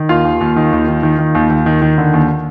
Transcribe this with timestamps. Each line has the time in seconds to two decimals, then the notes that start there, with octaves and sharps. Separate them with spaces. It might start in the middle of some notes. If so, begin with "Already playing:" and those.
Already playing: D#3
0.09 D#2 F4 F5
0.25 D#2
0.41 D#2
0.56 D#3
0.73 D#2
0.88 D#3
1.03 D#3
1.19 D#3
1.35 D#2
1.50 D#2
1.66 D#3
1.82 D#3
1.98 D3
2.14 D#2